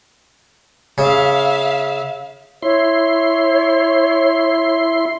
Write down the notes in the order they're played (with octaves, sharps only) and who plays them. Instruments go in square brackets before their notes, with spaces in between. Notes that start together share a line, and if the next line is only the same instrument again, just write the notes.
[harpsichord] C#3 [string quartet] E5 F5
[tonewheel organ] E4 C6 [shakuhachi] C#5